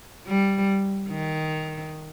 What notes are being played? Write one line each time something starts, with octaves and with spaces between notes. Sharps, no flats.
G3
D#3